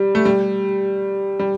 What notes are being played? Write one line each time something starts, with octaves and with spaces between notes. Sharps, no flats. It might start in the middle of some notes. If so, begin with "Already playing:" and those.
Already playing: G3
A3
G3
G3